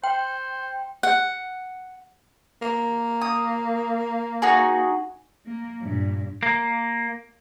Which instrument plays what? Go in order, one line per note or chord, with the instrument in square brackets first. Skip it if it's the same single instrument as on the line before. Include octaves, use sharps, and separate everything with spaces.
[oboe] C5 [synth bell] G5
[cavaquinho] F#5
[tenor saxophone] A#3
[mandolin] D#6
D#4 F#4 G#4
[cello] A#3
G2 A#2
[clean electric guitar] A#3